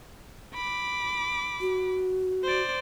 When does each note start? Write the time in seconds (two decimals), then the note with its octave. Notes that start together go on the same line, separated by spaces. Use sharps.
0.55 B5 D6
1.61 F#4
2.43 C5 D5